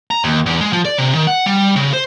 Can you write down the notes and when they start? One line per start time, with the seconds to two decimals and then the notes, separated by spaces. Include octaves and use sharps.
0.11 A#5
0.24 D#2
0.46 E2
0.61 G#3
0.73 F3
0.85 D5
0.98 C3
1.15 D#3
1.27 F#5
1.46 G3
1.76 C#3
1.93 C5